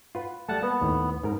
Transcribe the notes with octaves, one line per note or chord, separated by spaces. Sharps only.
F4 B4 F#5
G3 A3 F#5 A5
A#3 B3
D#2 A2
G#2 A#4